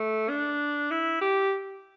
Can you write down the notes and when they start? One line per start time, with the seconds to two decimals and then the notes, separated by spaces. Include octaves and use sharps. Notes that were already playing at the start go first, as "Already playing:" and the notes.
Already playing: A3
0.29 D4
0.91 E4
1.21 G4